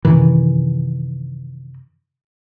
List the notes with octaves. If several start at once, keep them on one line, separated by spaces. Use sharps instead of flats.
F#2 C3 D#3 E3